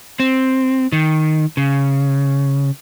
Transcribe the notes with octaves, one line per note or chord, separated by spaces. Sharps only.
C4
D#3
C#3